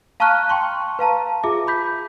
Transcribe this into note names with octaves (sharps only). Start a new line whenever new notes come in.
F5 A5 A#5 C#6 F6 F#6
G5 C6 C#6
B4 F5 A5 A#5
F4 G#4 E5 D6
B5 G6 B6